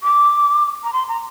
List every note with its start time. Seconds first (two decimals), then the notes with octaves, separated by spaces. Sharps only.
0.03 D6
0.84 A#5
0.93 C6
1.08 A#5